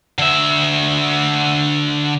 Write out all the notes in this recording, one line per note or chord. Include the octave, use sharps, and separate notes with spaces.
D3 E5